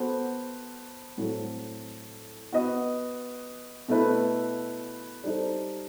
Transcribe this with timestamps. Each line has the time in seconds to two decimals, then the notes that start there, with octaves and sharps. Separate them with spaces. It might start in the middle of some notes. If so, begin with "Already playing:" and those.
Already playing: B3 F#4 A4 C5
1.17 A2 F#3 C4 F#4 A4
2.52 B3 F#4 B4 D#5
3.88 B2 A3 E4 B4
5.24 G3 D#4 A4 C5